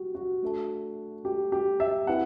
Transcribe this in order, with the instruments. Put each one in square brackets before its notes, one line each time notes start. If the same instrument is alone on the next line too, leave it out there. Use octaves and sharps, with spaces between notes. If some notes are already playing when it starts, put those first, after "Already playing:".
Already playing: [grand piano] F#4 G4
F#4
[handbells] A3 D4 A4 E5 A5
[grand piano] G4
G4
E5
[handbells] C4 E4 B4 [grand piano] F#5